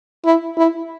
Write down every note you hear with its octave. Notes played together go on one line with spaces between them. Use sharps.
E4
E4